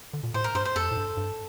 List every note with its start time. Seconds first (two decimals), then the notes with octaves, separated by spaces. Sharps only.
0.13 D3
0.23 A#2
0.34 A2 C5
0.44 A#4
0.55 G2 C5
0.65 C5
0.76 F2 A4
0.91 A2
0.97 G2
1.17 G2